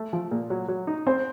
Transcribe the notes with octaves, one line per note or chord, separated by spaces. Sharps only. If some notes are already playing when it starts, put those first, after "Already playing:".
Already playing: A3
F3
A#2
F#3
F#3
D#4
C4 C5